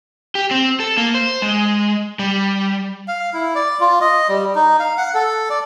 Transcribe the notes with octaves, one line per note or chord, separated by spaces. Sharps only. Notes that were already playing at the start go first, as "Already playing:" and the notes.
G4
C4
A4
A#3
C5
G#3
G3
F5
E4
D5
F4
D#5
G3
D#4
F5
F#5
A4
D5